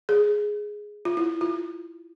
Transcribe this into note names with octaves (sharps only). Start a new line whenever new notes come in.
G#4
F4
E4
F4